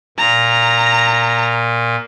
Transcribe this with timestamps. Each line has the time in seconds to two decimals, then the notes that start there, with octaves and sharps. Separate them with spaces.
0.18 A#2 A#5